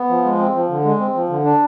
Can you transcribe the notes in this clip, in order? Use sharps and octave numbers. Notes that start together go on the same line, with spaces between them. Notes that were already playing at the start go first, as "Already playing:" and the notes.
Already playing: B3
F3
G#3
C4
F3
D3
G#3
C4
F3
D3
D4